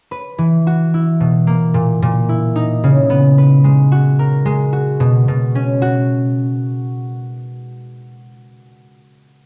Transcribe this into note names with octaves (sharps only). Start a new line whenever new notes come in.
B4
E3
F#4
E4
B2
A#3
A#2
A#2
E4
D#4
C#3
B3
B4
G#3
F#4
A#4
G#3
F#4
B2
B2
C#4
F#4